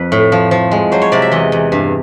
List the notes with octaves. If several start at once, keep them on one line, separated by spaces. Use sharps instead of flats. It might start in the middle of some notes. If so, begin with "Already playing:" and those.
Already playing: F2 B4
A2
F3
F3
G#3
F#3 C5
C#5
C3 D5
E5
E2 D#5
E2
G2